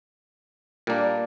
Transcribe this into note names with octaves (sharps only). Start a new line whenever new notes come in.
A#2 G3 A#3 D4